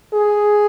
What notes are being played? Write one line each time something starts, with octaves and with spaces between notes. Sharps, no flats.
G#4